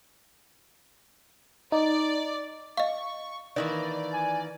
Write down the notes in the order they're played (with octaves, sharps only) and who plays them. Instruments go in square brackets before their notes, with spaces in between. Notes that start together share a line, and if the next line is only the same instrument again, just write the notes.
[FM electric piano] D#4 [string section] D5
[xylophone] D#5 F5 [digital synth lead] C#6
[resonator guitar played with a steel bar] D#3 E3 A#3 [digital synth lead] D5
[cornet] G#5